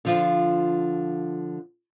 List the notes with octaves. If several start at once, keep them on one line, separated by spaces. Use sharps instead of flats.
D3 F3 F4